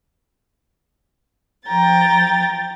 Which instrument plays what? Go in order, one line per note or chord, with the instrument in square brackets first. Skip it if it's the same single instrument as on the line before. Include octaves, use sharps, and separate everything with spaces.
[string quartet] F3 G5 A#5 A6